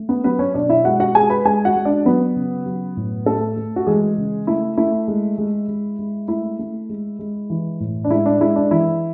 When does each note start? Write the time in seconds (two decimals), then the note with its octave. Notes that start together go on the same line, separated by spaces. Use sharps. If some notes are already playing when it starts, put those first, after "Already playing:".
Already playing: A3
0.09 B3 B4
0.24 F#3 B3 B4
0.39 C#4 C#5
0.54 B2 D4 D5
0.69 E4 E5
0.84 G#3 F#4 F#5
1.00 F#4 F#5
1.15 G#3 G#4 G#5
1.30 B4 B5
1.45 G#3 G#4 G#5
1.65 F#4 F#5
1.76 G#3
1.85 D4 D5
2.06 F#3 B3 B4
2.36 C#3
2.66 F#3
2.97 A2
3.26 A3 A4
3.57 A3
3.76 F#4
3.87 E3 G#3 G#4
4.17 C#3
4.47 A3 E4
4.77 A3 E4
5.08 G#3
5.38 G#3
5.68 G#3
5.99 G#3
6.28 A3 E4
6.59 A3
6.89 G#3
7.19 G#3
7.50 E3
7.80 A2
8.04 D4
8.10 G#3 E4
8.26 D4
8.40 G#3 E4
8.56 D4
8.71 E3 E4